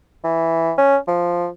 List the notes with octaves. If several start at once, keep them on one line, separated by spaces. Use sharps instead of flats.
E3
C#4
F3